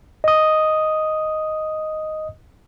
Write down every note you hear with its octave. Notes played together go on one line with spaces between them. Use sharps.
D#5 D#6